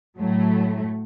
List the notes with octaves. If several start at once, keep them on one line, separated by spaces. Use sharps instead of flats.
A2 F#3 A3